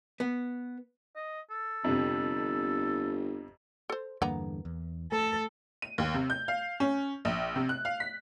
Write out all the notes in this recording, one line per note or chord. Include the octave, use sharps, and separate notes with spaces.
B3
D#5
A4
G1 F2 C3
A4 C5
E2 G2 D3 A#3 B3 A#5
E2
A3 A4
D#7
D#2
C3
G6
F5
C#4
A#1
C3
F#6
F5
B6